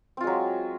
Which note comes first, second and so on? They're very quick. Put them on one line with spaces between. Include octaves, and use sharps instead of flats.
C4 F4 G#3 F#3